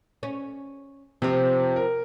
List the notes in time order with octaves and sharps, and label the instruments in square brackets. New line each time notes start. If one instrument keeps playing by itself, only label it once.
[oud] C#4
[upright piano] C3 [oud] F3 C4
[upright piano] A#4